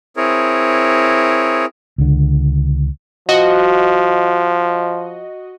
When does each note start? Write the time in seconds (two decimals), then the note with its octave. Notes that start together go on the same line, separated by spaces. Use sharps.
0.17 C4 E4 G#4 A#4 C#5
1.98 C#2 D3
3.29 F3 F#4 D#5